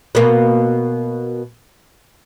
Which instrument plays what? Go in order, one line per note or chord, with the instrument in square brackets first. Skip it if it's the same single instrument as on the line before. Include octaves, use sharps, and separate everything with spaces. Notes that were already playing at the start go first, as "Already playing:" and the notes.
[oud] B2 A#3